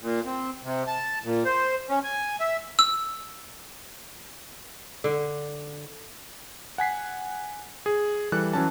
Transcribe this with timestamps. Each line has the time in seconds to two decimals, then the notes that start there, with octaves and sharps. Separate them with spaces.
0.01 A#2
0.26 C4
0.64 C3
0.87 A5
1.25 A#2
1.45 C5
1.89 C#4
2.04 G#5
2.40 E5
2.79 E6
5.04 D3
6.78 F#5 G#5 B6 C7
7.86 G#4
8.32 E3 G3 A4 D5 F#6
8.53 E3 F#3 C#4 A5